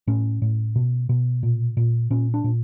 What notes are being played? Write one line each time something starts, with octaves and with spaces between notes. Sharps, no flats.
A2 C#4
A2
B2
B2
A#2
A#2
A#2 C#4
D4
A#2